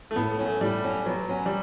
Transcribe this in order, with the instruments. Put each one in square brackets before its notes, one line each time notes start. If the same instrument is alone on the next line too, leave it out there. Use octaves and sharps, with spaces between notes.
[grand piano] A3
[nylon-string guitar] A2 [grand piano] B3
[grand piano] A3
[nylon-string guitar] F#3 C#4
[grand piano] A3
[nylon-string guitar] A2 [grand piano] G3
[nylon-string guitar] F#3 C#4
[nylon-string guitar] B2 [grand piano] F#3
[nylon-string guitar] F#3 C#4
[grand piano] G3